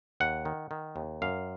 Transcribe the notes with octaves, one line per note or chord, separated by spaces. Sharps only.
D#2 F#5
D#3
D#3
D#2
F#2 F5